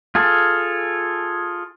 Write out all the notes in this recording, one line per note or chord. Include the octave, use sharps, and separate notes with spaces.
F4 G#4 A4